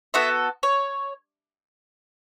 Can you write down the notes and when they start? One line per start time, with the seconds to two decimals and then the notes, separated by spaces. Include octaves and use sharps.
0.14 B3 F#4 A4 E5
0.63 C#5